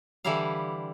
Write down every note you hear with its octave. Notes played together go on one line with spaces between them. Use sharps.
D3 E3 G3 E4 G4 F5